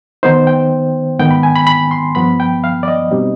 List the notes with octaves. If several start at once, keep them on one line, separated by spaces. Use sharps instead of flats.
D#3 B3 D#4 C5
G5
G#2 D#3 B3 G5
B5
G#5
B5
B5
C6
G2 F3 B3 B5
G5
F5
D5
D#5
B2 G3 C4 D#4